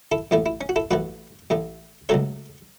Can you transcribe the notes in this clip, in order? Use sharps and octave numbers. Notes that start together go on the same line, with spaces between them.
E4 A4
A1 A2 A3 E4
E4
C#4
F#4
E4 A4
A1 A2 A3 F#4 B4
A1 A2 A3
C#2 C#3 F#3 A3 A4 C#5